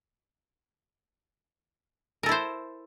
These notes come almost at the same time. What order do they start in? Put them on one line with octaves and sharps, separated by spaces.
A#4 A4 E4 C5